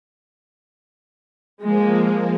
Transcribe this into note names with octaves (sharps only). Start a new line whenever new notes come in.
F3 G#3 A#3